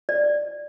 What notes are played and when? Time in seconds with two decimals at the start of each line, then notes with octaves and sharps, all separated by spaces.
0.09 D5